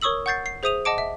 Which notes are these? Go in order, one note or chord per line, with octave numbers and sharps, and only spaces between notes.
A#4 C#5 C#6 D#6 E6 F#7
F#5 C#6 G6 A6 C7
C7
G#4 C5 E5 D#6 D#7 F7
D#5 F#5 A5 D6 D7
E5